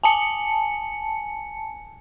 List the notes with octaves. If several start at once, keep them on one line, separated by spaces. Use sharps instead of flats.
G#5 A5 C#7